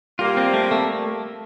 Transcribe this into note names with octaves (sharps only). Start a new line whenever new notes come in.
G3 A#3 F4
C4
A3
A3